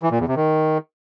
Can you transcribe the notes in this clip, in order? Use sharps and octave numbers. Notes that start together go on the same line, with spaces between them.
E3
A#2
E2
C3
D#3